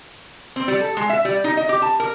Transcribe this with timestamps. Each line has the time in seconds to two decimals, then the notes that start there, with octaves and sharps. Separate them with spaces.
0.56 C4
0.68 G3
0.81 A4
0.97 G#3
1.10 E5
1.25 G3
1.44 D#4
1.57 D#5
1.69 G4
1.82 A5
2.00 A#4